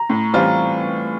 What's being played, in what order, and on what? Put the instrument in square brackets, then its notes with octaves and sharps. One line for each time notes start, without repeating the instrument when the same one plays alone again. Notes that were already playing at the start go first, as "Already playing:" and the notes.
Already playing: [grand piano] A#5
[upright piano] A2
E3 G3 C4 F4